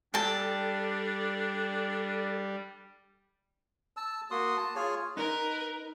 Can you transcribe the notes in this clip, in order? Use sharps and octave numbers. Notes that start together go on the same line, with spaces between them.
G3 D4 A4 G5 A5 A6
A5 E6
A#3 F#4 C6 D#6
A5
F4 G#4 C#5 G#5
D#4 A#4 B4